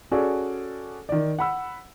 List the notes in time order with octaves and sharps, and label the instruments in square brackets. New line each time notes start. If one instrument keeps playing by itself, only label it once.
[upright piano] C#4 F#4 G#4 A4 D5
D#3 D5
F#5 B5 E6